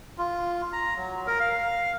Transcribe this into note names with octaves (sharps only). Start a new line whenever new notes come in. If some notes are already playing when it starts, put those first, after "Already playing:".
F4
A#5
F#3
A#4
F5